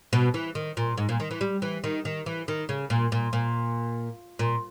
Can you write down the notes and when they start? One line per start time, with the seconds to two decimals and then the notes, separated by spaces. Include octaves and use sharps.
0.13 B2
0.34 E3
0.55 D#3
0.77 A#2
0.98 G#2
1.09 A#2
1.20 D#3
1.31 E3
1.41 G3
1.62 E3
1.84 D#3
2.05 D#3
2.26 E3
2.48 D#3
2.69 C#3
2.90 A#2
3.12 A#2
3.33 A#2
4.39 A#2